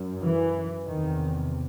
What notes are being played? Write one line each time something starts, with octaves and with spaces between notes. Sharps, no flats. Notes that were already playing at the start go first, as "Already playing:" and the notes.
Already playing: F#2
E3
E2 C3 D#3